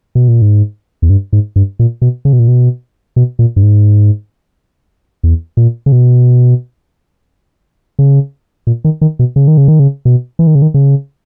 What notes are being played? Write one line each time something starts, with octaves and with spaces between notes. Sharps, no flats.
B2
A#2
G#2
E2
G2
G#2
G2
A#2
B2
C#3
B2
A#2
B2
B2
A#2
G2
G#2
E2
A#2
C#3
B2
C#3
A#2
D#3
D#3
B2
C#3
D#3
C#3
D#3
C#3
B2
E3
D#3
C#3
D#3
C#3